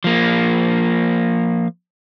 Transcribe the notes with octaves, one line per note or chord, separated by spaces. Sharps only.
F3 A#3